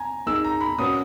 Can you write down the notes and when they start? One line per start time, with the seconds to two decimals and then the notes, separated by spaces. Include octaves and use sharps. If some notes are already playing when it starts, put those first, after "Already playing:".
Already playing: G#5 A#5
0.26 A#3 D#4 G#4 E6
0.45 A#5
0.61 B5
0.78 A#2 A#3 C#4 F#4 B4 D#6